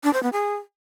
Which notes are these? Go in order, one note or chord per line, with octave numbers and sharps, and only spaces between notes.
D4
C5
B3
G#4